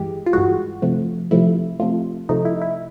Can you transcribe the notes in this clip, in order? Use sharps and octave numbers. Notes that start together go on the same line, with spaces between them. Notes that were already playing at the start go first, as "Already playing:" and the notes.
Already playing: G2 E3 G#3 G4
F4
G2 E3 G#3 F#4
C3 F3 A3
C3 F3 A3 E4
C3 F3 A3 F4
C3 F3 A3 D#4
E4
E4